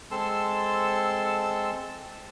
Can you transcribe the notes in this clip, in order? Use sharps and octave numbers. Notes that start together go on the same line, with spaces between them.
G#3 C4 A4 A5 C6 E6